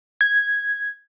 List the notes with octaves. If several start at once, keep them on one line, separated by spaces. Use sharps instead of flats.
G#6